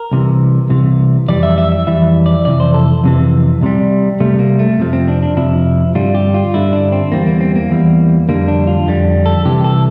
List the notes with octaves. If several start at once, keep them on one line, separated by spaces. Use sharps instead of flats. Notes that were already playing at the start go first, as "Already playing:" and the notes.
Already playing: A#4
C2 C3 E3
C2 C3 E3
F2 E3 G3 D5
E5
E5
E5
F2 E3 G3 E5
D5
F2 C3 E3 D5
C5
A4
F2 C3 E3
C2 C3 G3
C2 C3 G3 A3
A#3
A3
F2 C3 F3
C4
D4
D4
F2 C3 F3 E4
G2 D3 G3 F4
G4
F4
G2 D3 G3 E4
D4
C4
E2 E3 G3 A#3
A#3
C4
A#3
E2 E3 G3
F2 D3 G3 A#3
D4
F4
F2 D3 G3
A4
C2 C3 E3 G4
A4